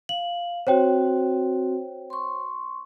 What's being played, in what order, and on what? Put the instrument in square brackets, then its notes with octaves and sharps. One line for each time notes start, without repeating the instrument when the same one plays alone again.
[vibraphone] F5 [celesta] F#7
[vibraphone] C4 F#4 [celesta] C5 C#5 G5
[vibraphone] C6 C#6